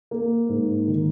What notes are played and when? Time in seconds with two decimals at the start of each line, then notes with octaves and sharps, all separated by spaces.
0.11 A#3
0.49 G#2
0.87 D#3